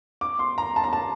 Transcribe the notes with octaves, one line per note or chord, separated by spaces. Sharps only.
D6
C6
A#5
A5
A#5
A5